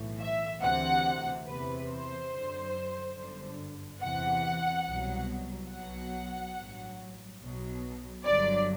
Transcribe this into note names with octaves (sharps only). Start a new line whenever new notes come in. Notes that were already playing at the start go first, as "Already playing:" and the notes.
Already playing: B1 A2 E3
E5
D2 C3 E3 F#5
E2 C3 E3 B4
C5
F#2 D3 F#3
G1 F#2 D3
E2 C3 E3 F#5
C2 B2 F#3
B1 B2 F#3 F#5
A1 G2 F#3
B1 B2 F#3
G1 G2 D3 F#3 D5